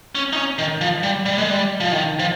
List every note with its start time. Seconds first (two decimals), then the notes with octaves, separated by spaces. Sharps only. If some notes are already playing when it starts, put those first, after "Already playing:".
0.15 C#4
0.33 D#4
0.36 C#4
0.58 D#3
0.81 F3
1.03 G3
1.26 G3
1.38 G#3
1.50 G3
1.80 F3
1.92 D#3
2.19 F3